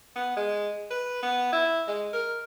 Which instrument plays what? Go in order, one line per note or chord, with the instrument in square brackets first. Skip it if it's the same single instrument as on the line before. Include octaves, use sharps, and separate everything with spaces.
[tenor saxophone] B3
G#3
B4
B3
E4
G#3
A#4